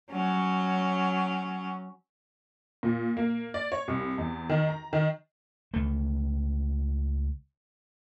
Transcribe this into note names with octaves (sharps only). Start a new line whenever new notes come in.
F#3 C#4
A#2
A#3
D5
C#5
C2
E2
D#3
A#5
D#3
C#2 A3